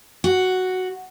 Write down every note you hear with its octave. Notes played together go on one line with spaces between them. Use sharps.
F#4